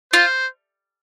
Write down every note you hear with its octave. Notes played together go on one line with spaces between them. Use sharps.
F4 C5